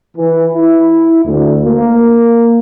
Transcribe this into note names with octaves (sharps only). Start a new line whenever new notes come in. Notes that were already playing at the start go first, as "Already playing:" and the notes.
E3
E4
D2
A#3